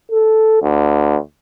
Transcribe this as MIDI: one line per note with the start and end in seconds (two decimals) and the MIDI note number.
0.12 0.58 69
0.62 1.16 38